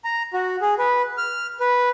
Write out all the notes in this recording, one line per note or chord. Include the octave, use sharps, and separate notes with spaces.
A#5
F#4
G#4
B4
F6
B4